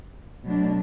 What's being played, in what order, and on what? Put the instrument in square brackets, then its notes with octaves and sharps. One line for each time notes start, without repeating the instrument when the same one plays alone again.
[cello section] B2 F#3 A3 D4